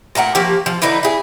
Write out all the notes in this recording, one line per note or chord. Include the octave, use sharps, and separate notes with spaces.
A#2 A3 A#4 F#5
F3 A#3 F#4 G4
F3
D3 D#4 E4 B4
E4 G#4